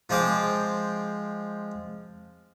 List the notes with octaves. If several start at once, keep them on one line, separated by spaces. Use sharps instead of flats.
F3 G#3 C4 D6